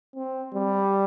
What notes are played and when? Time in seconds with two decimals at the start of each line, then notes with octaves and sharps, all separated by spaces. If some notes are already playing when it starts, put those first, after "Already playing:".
0.15 C4
0.54 G3